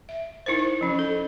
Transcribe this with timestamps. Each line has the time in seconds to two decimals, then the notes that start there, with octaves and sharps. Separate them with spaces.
0.09 E5
0.46 D#4 E4 A#4 C5
0.81 F3 C#4
0.99 A4